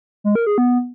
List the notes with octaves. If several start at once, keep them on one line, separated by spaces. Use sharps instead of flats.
G#3
A#4
G#4
B3